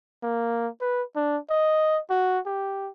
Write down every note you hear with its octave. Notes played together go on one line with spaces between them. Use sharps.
A#3
B4
D4
D#5
F#4
G4